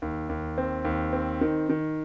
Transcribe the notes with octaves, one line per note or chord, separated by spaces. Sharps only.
D#2
D#2
C4
D#2
C4
D#3
D#3